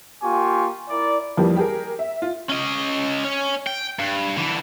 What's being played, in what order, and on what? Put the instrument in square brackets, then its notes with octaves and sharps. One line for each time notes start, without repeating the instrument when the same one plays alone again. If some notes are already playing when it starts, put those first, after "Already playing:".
[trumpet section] A#3 F4 G4 G#5 C#6
E4 A#4 D5
[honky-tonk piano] F2 E3 F3 G3 A#3 G4
G4 G#4 A#4
E5
F4
[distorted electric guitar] C#4 D#5
C#4
G5
G2
D3 E3